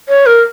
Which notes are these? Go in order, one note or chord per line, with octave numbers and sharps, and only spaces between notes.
C#5
A#4